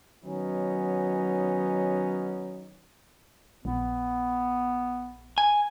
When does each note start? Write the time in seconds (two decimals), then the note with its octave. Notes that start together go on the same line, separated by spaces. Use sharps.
0.24 D#3 F#3 B3 C#4 D#4
3.65 A#1 B3
5.38 G#5